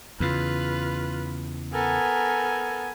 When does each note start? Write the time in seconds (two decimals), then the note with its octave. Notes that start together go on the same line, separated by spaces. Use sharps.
0.20 E2 C#3 F4 B4
1.73 B3 A4 A#4 G#5